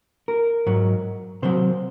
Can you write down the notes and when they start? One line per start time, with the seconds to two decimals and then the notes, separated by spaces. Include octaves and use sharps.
0.28 A#4
0.67 G#2 F#3
1.42 C3 F#3 C5